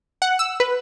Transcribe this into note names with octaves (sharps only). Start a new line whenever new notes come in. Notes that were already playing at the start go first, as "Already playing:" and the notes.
F#5
E6
B4